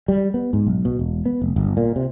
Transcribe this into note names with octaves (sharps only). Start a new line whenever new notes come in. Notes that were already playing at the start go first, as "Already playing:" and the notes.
G3
B3
G#2
B1
B2
E1
B3
F1
G1
A#2
C3